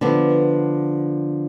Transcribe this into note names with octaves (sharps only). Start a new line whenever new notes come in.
D3 F3 B3